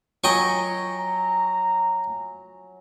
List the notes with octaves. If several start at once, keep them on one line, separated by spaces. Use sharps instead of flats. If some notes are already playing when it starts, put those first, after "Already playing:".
F#3 D#5 G5 G#5 C#6
A#5